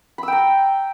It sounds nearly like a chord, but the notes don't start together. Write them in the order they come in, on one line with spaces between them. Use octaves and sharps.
B5 E6 G5 A#5